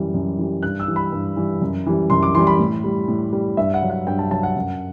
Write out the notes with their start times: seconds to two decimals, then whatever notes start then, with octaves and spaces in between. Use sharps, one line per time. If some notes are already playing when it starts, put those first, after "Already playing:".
Already playing: F#2 E3 G3
0.14 F#2
0.38 E3 G3
0.63 G2 F#6
0.80 E6
0.88 E3 G3
0.96 B5
1.12 G2
1.36 E3 G3
1.62 F#2
1.86 E3 G3
2.10 F#2 C6
2.23 D6
2.34 E3 C6
2.39 G3
2.47 B5
2.59 A2
2.84 G3
3.08 A2
3.33 G3
3.57 G2 E5
3.74 F#5
3.82 F#3
3.90 F#5
4.07 G2 G5
4.19 A5
4.31 F#3 A5
4.43 F#5
4.56 F#2